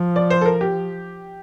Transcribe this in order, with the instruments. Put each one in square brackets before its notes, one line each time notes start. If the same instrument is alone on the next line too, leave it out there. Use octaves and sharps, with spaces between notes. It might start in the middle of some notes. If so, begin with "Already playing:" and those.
Already playing: [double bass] F3
[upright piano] D5
C5
A4
A#4
G4